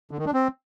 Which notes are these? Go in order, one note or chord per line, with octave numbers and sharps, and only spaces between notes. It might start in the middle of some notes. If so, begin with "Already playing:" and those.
D3
D#3
D4
C4